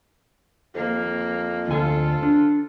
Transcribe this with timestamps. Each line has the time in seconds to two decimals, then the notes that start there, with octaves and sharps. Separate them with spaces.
0.75 F2 A#3
1.68 D2 F4 A4 G#5
2.22 D4